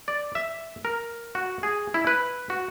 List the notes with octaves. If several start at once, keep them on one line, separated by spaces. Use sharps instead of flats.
D5
E5
A#4
F#4
G#4
E4
B4
F#4